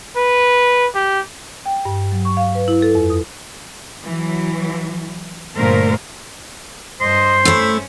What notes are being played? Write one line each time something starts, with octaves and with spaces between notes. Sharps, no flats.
B4
G4
G5
G2
F#3
C#6
F5
B4
E4
A4
F2
D#6
E3 F#3
G2 A#2 D3 A3 A#4 C5
G2 C5 D#5 C6
A3 C#4 E4